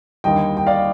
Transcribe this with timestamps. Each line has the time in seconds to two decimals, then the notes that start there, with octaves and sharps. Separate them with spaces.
0.24 D#2 D3 G3 D#5 G5
0.57 G5
0.67 D5 F5